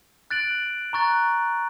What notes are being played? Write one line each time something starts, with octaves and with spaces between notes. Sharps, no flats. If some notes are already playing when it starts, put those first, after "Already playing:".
F#6 A6 D7 F#7
A#5 C#6 F#6 A6